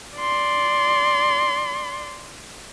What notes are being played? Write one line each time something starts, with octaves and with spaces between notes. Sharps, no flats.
D5 C6